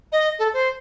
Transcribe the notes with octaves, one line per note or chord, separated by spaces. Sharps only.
D#5
A4
C5